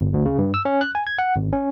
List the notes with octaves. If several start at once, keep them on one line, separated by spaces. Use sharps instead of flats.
G1
D2
C#3
G2
E6
C#4
F#6
G#5
G#6
F#5
G#1
C#4